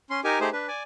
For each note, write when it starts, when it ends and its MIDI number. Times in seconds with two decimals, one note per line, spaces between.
0.10 0.20 61
0.10 0.20 84
0.24 0.39 63
0.24 0.39 67
0.24 0.39 70
0.24 0.39 80
0.41 0.49 57
0.41 0.49 63
0.41 0.49 67
0.41 0.49 68
0.41 0.49 72
0.53 0.67 62
0.53 0.67 71
0.68 0.83 74
0.68 0.83 80